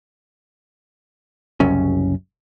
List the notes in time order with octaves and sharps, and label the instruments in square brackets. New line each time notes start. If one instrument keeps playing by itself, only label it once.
[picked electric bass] F#1 C2 F#2 C#4